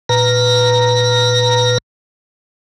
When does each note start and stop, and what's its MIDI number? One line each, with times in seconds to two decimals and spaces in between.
0.09 1.78 46
0.09 1.78 71
0.09 1.78 82